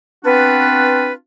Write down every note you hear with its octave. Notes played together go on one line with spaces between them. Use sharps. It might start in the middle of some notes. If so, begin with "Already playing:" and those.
B3 C4 D4 F4 F#4 B4